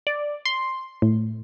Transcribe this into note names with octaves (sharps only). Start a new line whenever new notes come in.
D5
C6
A2